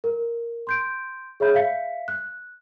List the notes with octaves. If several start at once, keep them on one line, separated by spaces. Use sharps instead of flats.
A#4
C6 G6 D7
G#4 C#5 E5 B5 G6
E5 F5 B6 C#7
F#6